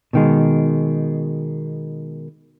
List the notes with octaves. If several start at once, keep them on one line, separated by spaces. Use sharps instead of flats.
B2 D#3 G#3